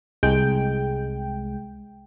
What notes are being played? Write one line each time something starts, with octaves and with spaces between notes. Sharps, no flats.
C2 G#3 G5